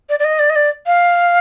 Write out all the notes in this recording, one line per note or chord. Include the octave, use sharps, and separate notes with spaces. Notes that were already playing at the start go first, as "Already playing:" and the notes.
D5
D5
D#5
D5
D#5
D5
F5